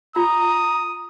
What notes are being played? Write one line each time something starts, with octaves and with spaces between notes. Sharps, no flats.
F4 A#5 D#6